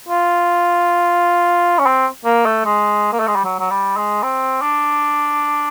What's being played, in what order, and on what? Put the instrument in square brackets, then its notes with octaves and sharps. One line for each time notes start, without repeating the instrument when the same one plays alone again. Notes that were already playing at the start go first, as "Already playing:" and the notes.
[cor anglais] F4
C#4
C4
A#3
A3
G#3
A#3
A3
G#3
G3
F#3
F#3
G3
G#3
C4
D4